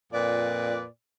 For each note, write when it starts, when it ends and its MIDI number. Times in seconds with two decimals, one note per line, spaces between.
0.13 0.84 41
0.13 0.84 46
0.13 0.84 71
0.13 0.84 74